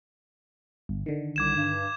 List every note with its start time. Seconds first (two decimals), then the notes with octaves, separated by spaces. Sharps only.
0.89 G1
1.06 D3 D#3
1.36 C2 D6 G#6 E7
1.56 G2